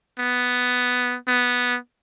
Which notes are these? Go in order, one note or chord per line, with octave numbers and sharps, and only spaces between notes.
B3
B3